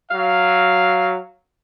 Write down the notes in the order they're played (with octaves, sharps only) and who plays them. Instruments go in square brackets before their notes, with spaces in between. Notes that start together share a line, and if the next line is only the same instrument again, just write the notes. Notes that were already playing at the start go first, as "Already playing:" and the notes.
[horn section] F#3 F5